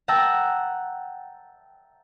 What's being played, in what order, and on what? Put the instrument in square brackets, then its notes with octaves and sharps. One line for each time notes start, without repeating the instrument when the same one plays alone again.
[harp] F#5 G5 A5 A#5 E6 F#6